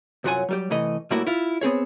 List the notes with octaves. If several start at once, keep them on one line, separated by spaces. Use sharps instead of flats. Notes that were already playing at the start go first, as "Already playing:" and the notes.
C2 F#2 F#3 F4 F#5 G#5
F#3 G3 G4
C3 E3 A3 D#5
A2 G3 A3 A#3 E4 F#4
E4 F4
B3 C4 G#4 C#5